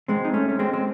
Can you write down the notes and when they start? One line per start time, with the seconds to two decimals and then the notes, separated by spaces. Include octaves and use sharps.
0.08 G#3 C4
0.25 D#4
0.34 A3 C#4
0.49 C#4
0.59 G#3 C4
0.73 C4